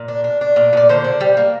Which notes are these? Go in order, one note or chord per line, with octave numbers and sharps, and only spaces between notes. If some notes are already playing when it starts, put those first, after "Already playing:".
Already playing: A#2
D4
D4
D4
A#2
A#2 D5
D3 C5
D4
G3
A#3